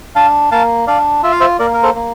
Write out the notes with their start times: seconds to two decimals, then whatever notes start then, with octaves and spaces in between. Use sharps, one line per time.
0.15 D4 F5 A5
0.51 A#3 F5 A5
0.87 D4 D5 F5
1.23 F4 E5
1.32 F5
1.40 C5 E5
1.59 A#3 A#4 D5
1.74 A#4
1.83 A4 C5
1.95 A#3